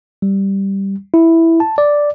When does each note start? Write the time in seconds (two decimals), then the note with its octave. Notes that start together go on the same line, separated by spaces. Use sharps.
0.22 G3
1.14 E4
1.60 A5
1.78 D5